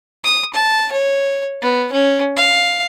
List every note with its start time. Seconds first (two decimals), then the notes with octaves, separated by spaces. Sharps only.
0.24 D#6
0.54 A5
0.93 C#5
1.62 B3
1.93 C#4
2.37 F5